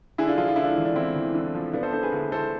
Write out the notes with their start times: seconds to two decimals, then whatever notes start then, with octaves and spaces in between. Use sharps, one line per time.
0.18 D3 E4 G#4
0.28 D4 F4
0.38 F3 D4 F4
0.48 F4
0.56 D3 E4
0.63 D4 F4
0.77 E2
0.85 D4
0.96 E2 C4 E4
1.16 E2
1.35 D3
1.55 F3
1.73 F3 B3 D4
1.83 A4 C5
1.93 D3 A4 C5
2.03 G#4 B4
2.12 D2
2.32 D2 A4 C5